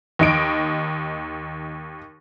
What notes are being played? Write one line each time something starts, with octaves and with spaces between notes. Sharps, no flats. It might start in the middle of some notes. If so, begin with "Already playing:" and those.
D#2 D#4 D7